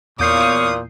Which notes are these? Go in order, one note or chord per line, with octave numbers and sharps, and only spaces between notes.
E2 A#2 C#5 F5 C#6 D#6 G6 C7